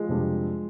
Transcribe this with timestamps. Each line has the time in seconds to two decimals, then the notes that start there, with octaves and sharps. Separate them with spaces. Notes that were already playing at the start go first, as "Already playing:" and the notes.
Already playing: F3 G#3
0.09 F2 C3 G3 D4